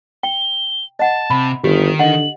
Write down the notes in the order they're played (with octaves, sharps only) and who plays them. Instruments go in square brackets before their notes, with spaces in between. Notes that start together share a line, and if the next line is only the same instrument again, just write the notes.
[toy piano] G5 [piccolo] G7
[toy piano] D#5 F#5 [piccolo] A5
[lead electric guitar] C3 [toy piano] B5
[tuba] G1 [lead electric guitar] D#3 [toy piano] G4 [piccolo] B6
[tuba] D3 [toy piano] D#5 F#5 [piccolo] F#7